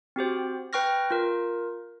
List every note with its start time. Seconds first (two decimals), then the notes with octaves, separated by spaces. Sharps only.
0.16 C4 F#4 G4 C5
0.73 B4 G5 C#6 F6 A#6
1.11 F4 A#4